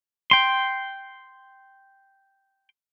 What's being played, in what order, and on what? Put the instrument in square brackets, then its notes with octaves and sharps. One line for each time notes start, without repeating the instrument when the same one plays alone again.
[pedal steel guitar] G5 C6